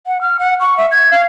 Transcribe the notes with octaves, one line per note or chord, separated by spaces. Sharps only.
F#5
F6
F#5
C#6
E5
G#6
F5